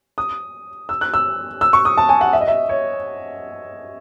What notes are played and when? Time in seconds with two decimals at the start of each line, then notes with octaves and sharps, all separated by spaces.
0.18 D#6
0.89 E6
1.01 F#6
1.14 E6
1.61 E6
1.73 C#6
1.85 D#6
1.97 A5
2.09 G#5
2.21 F#5
2.33 E5
2.41 D#5
2.48 E5
2.69 C#5